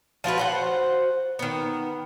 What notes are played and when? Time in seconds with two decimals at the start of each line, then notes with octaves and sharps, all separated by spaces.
0.24 F3 F4 F#4 B4
0.38 F#4 C5 F#5
1.39 D#3 B3